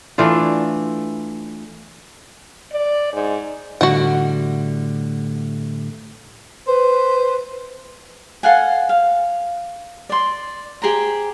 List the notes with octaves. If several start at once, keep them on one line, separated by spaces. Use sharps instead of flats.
E3 A3 D4 F4
D5
G#2
A2 D3 G3 F#4 F#5
B4 C5
A4 F5 F#5 G#5
F5
D5 C6
G4 G#4 C5 A#5